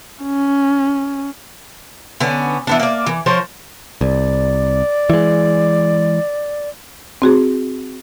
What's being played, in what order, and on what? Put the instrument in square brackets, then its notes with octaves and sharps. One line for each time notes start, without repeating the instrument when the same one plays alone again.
[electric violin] C#4
[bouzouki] D3 B3 C#4
E3 B3 D4
A#3 D5
E3
F3 A#4 C5 C#5
[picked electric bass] C2 [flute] D5
[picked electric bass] E3 G#3
[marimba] C4 F#4 G#4